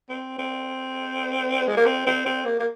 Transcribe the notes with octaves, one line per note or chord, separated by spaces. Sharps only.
C4
C4
G#3
A#3
C4
C4
C4
A#3
A#3